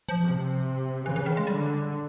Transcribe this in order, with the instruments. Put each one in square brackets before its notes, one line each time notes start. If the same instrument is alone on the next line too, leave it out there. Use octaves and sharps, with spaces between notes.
[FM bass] F3
[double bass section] C3
[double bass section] C#3 [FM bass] E3
[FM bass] E3
D#3
G#3
[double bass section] D3 [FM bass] G3